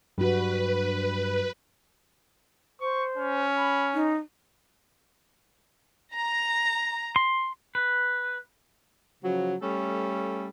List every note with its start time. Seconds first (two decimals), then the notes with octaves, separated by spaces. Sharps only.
0.18 G2 F#3 F#4 B4
2.80 C5 C#6
3.17 C#4
3.57 B5
3.94 D#4
6.13 A#5
7.16 C6
7.75 B4
9.23 C#3 F3 F#3
9.62 G3 A3 C#4 A4